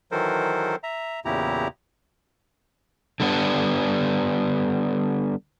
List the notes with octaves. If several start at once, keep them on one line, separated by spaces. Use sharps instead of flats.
D#3 E3 F#3 A4 A#4 C5
E5 A#5
E2 A#2 C#3 E4 G4 A#5
D3 G3 B3 D4